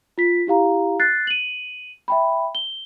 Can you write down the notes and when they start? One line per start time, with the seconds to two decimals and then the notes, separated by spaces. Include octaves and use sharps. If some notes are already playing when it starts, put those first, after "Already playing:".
0.18 F4 B6
0.47 E4 G4 F5 A#5
1.00 F#6 A6 C7
1.27 D#7 F#7
2.08 E5 G5 B5
2.55 G7